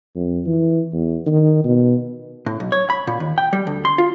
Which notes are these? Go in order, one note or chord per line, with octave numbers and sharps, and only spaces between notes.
F2
E3
E2
D#3
B2
A2
B1
C#5
B5
A#2
D#2
G5
G3
D2
C6
F4